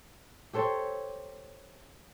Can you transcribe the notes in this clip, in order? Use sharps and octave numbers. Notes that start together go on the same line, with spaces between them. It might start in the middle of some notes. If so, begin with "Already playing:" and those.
G4 A4 C5 C#5